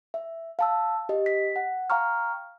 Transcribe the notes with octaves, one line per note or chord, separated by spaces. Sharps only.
E5
F5 A5 E6
G4 D#5
B6
F#5
F5 G5 A#5 C#6 F6